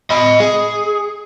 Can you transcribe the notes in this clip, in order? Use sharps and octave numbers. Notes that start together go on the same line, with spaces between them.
D#5 B5
G#4